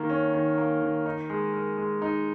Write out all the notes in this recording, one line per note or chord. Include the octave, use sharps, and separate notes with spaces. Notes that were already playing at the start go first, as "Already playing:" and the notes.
Already playing: D#3 A#3
C#4
D#3
A#3
D#3
D#4
G#3
A#4
G#3
D#4